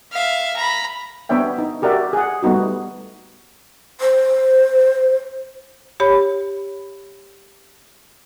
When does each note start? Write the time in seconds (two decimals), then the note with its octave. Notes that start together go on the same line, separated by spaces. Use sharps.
0.12 E5 F5
0.56 A#5 B5
1.29 B3 D4 C#5 E5 G5
1.58 D#4
1.82 F#4 G4 A#4 D5 E5
2.13 G#4 F#5
2.43 G3 A3 B3 D#4 F#4
4.00 C5
6.00 G4 C#5 B5